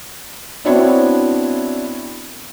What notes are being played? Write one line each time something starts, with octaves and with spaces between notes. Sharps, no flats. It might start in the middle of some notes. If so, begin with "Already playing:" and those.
B3 C4 D4 E4 F#4 C#5